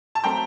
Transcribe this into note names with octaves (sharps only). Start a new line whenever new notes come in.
A5
F#3 A3 C4 G5 A#5